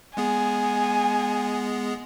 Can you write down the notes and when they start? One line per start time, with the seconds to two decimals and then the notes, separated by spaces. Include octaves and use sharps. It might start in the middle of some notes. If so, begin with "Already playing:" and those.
0.17 G#3 B3 G#4 G#5